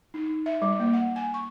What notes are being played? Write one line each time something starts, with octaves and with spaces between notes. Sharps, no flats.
D#4
E5
G3
A#3
F#5
G#5
C#6